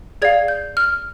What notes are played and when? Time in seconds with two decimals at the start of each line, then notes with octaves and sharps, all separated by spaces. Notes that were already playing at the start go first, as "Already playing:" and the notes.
0.22 G#4 D5 F5 G#6
0.48 G6
0.77 F6